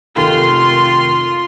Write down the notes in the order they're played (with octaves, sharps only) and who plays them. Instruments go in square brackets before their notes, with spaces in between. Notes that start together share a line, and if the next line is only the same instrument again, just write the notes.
[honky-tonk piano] F1 D#3 A#4 [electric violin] F4 C6